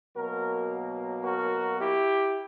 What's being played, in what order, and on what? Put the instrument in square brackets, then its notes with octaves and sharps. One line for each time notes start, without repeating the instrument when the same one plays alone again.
[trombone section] B2 F#3 A#3 F#4 A#4
F#4 A#4
E4 G4